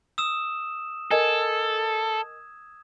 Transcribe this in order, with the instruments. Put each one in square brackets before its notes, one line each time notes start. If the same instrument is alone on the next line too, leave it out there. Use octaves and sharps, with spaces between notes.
[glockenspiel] D#6 E6 E7
[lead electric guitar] A4 [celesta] A#4 D#5 G#5 [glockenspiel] G#6